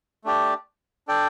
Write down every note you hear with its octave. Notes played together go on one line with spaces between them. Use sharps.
A3 D4 G4 D5
D4 A4 D5 G5